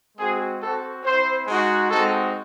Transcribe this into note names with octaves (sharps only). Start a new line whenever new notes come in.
G#3 C4 F#4 G#4
C4 F#4 A4
C4 E4 C5
G#3 D#4 F#4
G#3 C4 D#4 F#4 A4